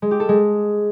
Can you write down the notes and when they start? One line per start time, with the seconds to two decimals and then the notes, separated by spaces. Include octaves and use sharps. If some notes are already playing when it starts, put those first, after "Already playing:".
0.02 G#3
0.11 G4
0.20 A4
0.29 G#3